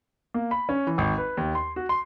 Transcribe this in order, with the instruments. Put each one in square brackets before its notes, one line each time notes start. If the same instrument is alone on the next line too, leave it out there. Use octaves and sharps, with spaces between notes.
[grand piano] A#3
B5
C#4
E3
G#1
B4
D#2
C6
F#4
C6